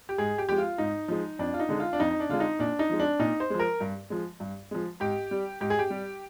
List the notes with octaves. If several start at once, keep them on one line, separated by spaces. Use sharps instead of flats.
G4
G#2 G#4
G4
F3 G#3 G4
F4
G#2 D#4
F3 G#3
F2 D4
F4
D#4
D3 G#3
F4
D4
F2 D#4
D4
D3 G#3 F4
D#4
A#2 D4
D#4
F3 G#3
D4
A#2 D#4
C5
F3 G#3
A#4
G2
F3 G#3
G2
F3 G#3
G#2 G4
G3
G#2 G4
G#4
G4
G3